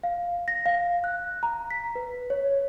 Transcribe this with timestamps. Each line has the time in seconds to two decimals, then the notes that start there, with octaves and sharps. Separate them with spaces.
0.03 F5
0.48 A#6
0.66 F5
1.04 F#6
1.43 A#5
1.71 B6
1.95 B4
2.30 C#5